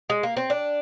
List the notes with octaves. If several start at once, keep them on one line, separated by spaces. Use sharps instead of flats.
G#3
A#3
C4
D4